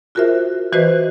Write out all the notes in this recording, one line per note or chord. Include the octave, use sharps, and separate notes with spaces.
F4 F#4 G#4 A#4 C5 E5
E3 F#4 B4 C5 D#5